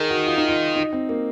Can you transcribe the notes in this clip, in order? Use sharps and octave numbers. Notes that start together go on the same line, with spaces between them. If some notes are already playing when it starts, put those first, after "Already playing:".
Already playing: D#3 G#4 A#4
F#4
F4
D#4
F4
D#4
C4
A#3